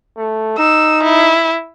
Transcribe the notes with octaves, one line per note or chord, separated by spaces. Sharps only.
A3
D#4 E6
E4